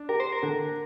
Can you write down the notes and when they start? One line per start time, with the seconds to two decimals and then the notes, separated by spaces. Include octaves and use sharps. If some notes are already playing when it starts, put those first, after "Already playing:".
Already playing: D4
0.09 G4 A#4
0.20 C5
0.32 A#4
0.43 D3